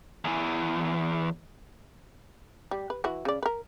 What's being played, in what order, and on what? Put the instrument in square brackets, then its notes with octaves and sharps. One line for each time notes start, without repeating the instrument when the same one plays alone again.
[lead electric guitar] E2 E3
[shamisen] G3
B4
E3 E4 F#4
C#3 D5
A#4 B4